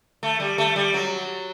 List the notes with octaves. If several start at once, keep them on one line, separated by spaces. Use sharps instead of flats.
A3
G3
A3
G3
F#3